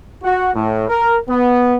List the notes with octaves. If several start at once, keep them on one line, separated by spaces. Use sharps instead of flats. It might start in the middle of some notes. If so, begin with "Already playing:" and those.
F#4
A2
A#4
B3